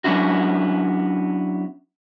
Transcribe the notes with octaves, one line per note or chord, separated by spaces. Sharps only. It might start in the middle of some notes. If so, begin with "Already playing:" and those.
F#3 B3 C#4 D4 E4 F#4